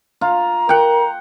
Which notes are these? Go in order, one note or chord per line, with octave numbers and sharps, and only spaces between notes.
F4 A#5
A#4 F#5 G5